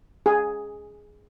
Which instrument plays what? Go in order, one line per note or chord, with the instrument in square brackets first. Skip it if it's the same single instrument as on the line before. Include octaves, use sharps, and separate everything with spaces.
[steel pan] G#4